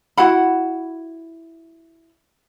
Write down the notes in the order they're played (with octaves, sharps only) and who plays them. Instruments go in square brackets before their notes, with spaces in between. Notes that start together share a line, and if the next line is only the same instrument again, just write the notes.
[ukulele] E4 F#4 F#5 B5